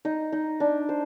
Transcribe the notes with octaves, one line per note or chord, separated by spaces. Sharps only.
D#4
D#4
D4
C5